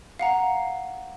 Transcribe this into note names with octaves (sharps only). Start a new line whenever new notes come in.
F5 F#5 A#5